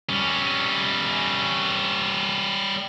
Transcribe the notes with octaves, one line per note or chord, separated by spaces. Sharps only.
G3 C#4